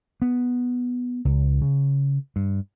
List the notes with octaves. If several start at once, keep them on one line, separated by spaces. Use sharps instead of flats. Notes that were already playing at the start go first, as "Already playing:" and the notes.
B3
C#2
C#3
G2